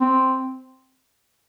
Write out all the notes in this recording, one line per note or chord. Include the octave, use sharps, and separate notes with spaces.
C4